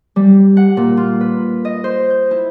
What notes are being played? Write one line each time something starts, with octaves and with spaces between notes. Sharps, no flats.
G3
F#5
A#2
F4
B4
D#5
C5
G6
E4